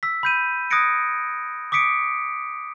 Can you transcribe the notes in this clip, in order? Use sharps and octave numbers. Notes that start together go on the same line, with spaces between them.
E6 B6
B5 G6 D#7
D#6 F#6 G#6 A#6 C#7 D7
D6 D#6 B6 C#7 D7